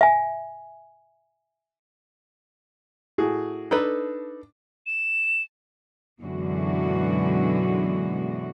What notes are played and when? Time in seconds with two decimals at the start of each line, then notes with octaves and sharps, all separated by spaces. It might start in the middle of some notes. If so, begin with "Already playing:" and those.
0.01 E5 G#5
3.18 A2 F#4 G#4
3.71 D4 D#4 A4 B4
4.86 E7
6.21 F#2 B2 D3 E3 G#3 F#4